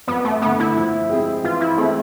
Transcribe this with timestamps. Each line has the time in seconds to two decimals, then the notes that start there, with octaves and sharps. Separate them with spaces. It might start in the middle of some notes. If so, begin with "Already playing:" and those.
0.08 F2 B3
0.25 A3
0.42 D3 A3 B3
0.60 E4
0.76 F3
1.09 G#3 C4 G#4
1.44 E3 F4
1.61 E4
1.77 G#3 A3 C4 E4